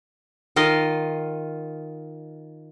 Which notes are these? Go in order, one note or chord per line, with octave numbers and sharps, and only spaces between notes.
D#3 F4 D#5 F5